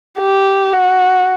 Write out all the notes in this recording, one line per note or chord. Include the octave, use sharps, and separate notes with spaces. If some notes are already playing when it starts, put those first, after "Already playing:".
G4
F#4